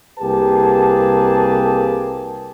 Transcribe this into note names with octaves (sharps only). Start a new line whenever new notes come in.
C2 A#3 G4 G#4 B4 A5